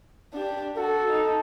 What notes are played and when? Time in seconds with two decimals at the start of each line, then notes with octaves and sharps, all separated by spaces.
0.34 D4 G4
0.77 F#4 A4
1.11 D#4